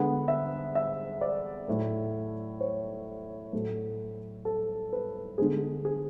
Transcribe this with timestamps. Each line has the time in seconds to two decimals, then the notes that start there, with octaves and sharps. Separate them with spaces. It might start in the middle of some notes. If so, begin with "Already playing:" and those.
Already playing: D3 G#3 B3 F#5
0.28 E5
0.75 E5
1.21 D5
1.68 A2 F#3 A3
2.61 C#5
3.53 A2 F#3 A3
4.45 A4
4.93 B4
5.38 D3 G#3 B3 G#4
5.85 G#4